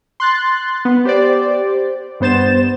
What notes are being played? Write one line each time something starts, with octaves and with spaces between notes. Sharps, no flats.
C6 F#6 A6
B3
G4 C5 D5
G2 B3 C5 A6 E7